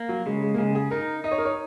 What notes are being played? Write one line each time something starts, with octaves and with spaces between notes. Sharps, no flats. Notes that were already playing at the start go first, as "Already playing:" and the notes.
Already playing: A#3
F#3
C#3 G#3
G#3
A#3
C#3 G#3
G#4
D#4 A#4
D#4 D#5
C#5
A#4
C#5